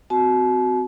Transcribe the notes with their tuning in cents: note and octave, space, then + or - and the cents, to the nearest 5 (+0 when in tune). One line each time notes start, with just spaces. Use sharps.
C4 -30 F#4 +0 A5 -40